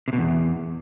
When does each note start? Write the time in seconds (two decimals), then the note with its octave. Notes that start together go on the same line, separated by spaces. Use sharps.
0.08 C3
0.13 B2
0.18 E2